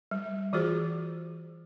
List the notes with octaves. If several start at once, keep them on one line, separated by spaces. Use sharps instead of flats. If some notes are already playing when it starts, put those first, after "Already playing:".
G3
E3 F4 F#4 G#4 C5